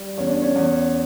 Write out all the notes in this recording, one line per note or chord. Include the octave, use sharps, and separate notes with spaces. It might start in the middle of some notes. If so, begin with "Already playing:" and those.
Already playing: G3
E2 C#4
D4
C#4
E2